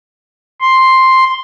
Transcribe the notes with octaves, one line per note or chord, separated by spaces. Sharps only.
C6